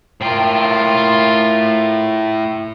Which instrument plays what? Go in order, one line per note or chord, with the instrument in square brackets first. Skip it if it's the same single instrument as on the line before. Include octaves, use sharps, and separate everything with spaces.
[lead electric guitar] A2 G5 [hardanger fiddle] F4 A#4